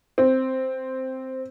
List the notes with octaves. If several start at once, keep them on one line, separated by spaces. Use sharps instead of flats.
C4